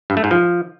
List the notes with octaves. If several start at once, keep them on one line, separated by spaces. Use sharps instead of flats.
G2
A3
G#2
F3